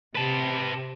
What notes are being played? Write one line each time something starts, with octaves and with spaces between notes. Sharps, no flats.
C3 B4 A5